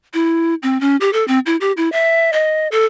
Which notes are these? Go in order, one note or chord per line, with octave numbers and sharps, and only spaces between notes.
E4
C4
C#4
G4
A4
C4
E4
G4
E4
E5
D#5
A4